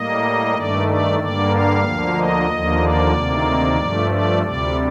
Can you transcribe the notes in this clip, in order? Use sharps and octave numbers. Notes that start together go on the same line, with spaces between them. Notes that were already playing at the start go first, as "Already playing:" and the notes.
Already playing: A2 G3 A#3 D#5
G2 D#3 A3 D5
D5
G2 D3 G3 A#3 D5
F5
D2 D3 F3 A#3
D#5
D#2 D3 F3 A#3
D5
D2 C3 D#3 A#3
G2 F3 A3
D5
D2 C3 G3 D5